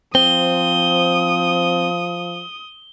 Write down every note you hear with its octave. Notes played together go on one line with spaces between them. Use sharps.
F3 C4 D#6 G7